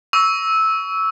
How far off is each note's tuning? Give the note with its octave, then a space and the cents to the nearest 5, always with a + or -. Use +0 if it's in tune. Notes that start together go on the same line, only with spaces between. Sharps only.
C#6 +25 E6 -10